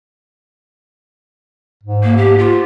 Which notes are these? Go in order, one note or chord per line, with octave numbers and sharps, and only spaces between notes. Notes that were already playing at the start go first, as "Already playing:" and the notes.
G#2
A#3
G4
F4